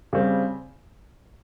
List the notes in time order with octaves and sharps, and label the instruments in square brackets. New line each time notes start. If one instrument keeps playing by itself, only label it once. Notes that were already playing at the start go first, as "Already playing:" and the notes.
[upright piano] C#3 G3 C4